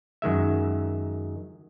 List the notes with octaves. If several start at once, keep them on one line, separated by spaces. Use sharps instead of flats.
F#2 D#3 G#3 E5